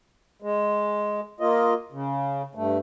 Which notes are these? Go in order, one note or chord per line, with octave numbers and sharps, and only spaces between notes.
G#3
A#3 F4 D#5
C#3
G2 A3